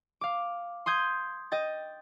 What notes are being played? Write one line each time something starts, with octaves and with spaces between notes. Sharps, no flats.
F5 D6
C6 D#6 G6 G#6
D#5 G5 A6